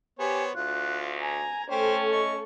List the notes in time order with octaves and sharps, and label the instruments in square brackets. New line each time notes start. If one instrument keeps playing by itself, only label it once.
[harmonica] B3 C5 C#5 [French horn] G4 [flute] G#5
[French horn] D2 [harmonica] F4 [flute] F#6
[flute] G#5 [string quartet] A#5 G#6
[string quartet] A3 A4 [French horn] C#4 [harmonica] C5 [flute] G5
[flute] D#5 [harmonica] C#6